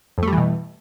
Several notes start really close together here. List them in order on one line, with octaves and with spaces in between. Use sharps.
F2 A3 G3 E3 B2